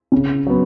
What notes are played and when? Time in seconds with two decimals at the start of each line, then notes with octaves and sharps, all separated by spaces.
0.12 C#3
0.47 F#3 B3